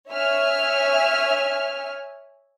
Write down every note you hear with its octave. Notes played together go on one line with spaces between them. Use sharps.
C#5 E5 G#5 F6